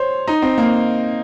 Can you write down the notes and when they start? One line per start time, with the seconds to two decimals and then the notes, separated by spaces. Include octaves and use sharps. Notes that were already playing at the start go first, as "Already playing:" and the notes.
Already playing: C5 C#5
0.28 D#4
0.42 C4
0.58 A#3